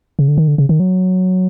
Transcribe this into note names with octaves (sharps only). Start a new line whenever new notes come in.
C#3
D3
D#3
D3
C#3
D#3
F#3